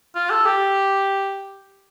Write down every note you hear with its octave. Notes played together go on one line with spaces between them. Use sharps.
F4
A4
G4